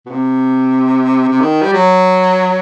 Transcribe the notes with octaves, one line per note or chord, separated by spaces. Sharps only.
B2
C3
C3
D#3
G3
F#3